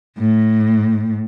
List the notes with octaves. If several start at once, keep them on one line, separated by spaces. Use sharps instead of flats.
A2